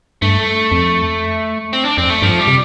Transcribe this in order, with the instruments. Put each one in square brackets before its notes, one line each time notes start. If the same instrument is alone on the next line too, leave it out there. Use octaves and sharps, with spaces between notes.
[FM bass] G2 [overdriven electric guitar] A3
[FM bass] F2
[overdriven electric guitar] C4
D4
[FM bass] F2 [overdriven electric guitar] C4
[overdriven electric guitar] A3
[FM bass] G2 [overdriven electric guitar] F3
[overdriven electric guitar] G3
[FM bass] C3